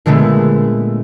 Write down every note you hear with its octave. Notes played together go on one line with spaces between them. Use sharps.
A#2 D3 G#3 A3 B3